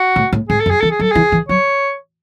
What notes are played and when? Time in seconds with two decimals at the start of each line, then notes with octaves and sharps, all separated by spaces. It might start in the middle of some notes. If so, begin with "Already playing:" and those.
Already playing: F#4
0.16 A2
0.33 A2
0.49 G#2 G#4
0.60 A4
0.66 F#2
0.70 G#4
0.81 E3 A4
0.91 G#4
0.99 F#3 A4
1.11 E3 G#4
1.32 E3
1.49 F#3 C#5